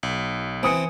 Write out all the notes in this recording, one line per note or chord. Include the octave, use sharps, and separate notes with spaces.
B1
E3 C4 G#5 D#6 C#7